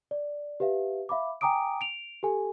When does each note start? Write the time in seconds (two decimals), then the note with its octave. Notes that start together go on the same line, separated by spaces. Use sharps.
0.11 D5
0.60 G4 B4 E5 F5
1.09 E5 F5 B5 D6
1.41 G5 G#5 A#5 D6 D#6 D7
1.81 D7 F7
2.23 G4 A4 G#5